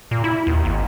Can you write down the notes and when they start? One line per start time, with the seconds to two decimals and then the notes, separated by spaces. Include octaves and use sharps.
0.11 A#2
0.24 E4
0.47 D#2
0.65 G#1